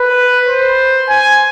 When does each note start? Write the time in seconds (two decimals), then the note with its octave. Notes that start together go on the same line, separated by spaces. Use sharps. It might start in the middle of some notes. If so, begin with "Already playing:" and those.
Already playing: B4
0.48 C5
1.09 G#5